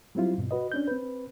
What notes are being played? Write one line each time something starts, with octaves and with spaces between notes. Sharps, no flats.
F#3 G3 C4 E4 F4
G2 B2
F#4 B4 D#5
C#4 D4 G6
C4 B4